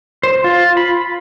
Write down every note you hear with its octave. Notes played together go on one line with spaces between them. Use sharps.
C5
F4
B5